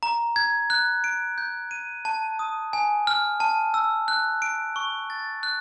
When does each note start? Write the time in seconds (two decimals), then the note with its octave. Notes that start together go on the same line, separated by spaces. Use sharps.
0.03 A#5
0.36 G#6
0.70 F#6
1.04 D7
1.38 G6
1.71 D#7
2.05 A5
2.39 D#6
2.73 G#5
3.07 F6
3.40 A5
3.74 E6
4.08 F#6
4.42 D7
4.76 C#6
5.10 A6
5.43 F#6